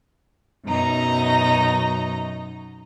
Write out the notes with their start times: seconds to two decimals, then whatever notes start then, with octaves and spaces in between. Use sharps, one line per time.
0.65 F#2 B2 D#4 A#5